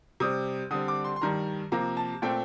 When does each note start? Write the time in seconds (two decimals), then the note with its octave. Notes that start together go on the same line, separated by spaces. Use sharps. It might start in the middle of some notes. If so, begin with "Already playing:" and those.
0.20 C3 G3 C4 D#6
0.71 D3 G3 C4 D#6
0.88 D6
1.04 C6
1.16 C6
1.21 G2 D#3 G3 A#5
1.72 C3 F3 A#3 A#5
1.97 A5
2.22 A#2 A3 C4 G5